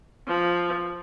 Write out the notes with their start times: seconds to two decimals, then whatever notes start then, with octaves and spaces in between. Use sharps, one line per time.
0.28 F3